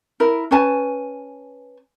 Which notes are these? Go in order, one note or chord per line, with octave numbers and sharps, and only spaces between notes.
E4 A#4
C#4 B4 G#5 A5